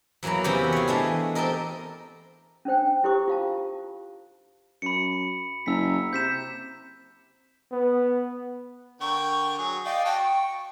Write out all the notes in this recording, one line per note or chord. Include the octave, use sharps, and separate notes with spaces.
E2 F#3 A#3 B4 A#5
E2 C3 B3 C#4 F#4 G4
C#5 F5
E3 G#3 A3 D4
C4 G4 A4 A#4 D#5
C#4 D4 C5 G5
E4 G4 A4 C5 C#6 D6
F4 F5 A5
F#2 B5 C#7
F#1 A#5 E6 B6
C3 G6 B6 E7
B3
D3 A#4 G5 C#6
F#3 G#4
D5 D#5 F5 G5
F#4 G5 A5
C#6